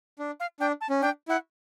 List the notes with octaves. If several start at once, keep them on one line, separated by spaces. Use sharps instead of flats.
D4
F5
D4 G5
A5
C#4
D4 G5
E4 F#5